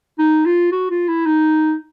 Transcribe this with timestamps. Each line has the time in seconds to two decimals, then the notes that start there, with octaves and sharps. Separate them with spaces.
0.19 D#4
0.46 F4
0.72 F#4
0.90 F4
1.08 E4
1.26 D#4